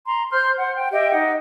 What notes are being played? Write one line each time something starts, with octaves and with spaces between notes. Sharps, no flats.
A#5 C6
C5 C6 F6 G6
C5 F#5
G5
G4 D#5 E5 G5
D#4 D#5 F#5